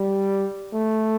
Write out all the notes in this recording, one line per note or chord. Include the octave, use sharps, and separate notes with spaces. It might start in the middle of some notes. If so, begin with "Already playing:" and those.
Already playing: G3
A3